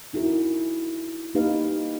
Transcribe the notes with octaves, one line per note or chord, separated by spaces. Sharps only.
D#4 E4 F#4 G#4 A#4
A#3 D#4 G4 B4 F5